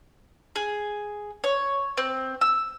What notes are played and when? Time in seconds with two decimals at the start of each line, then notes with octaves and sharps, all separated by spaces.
0.56 G#4
1.44 C#5
1.97 C4
2.41 E6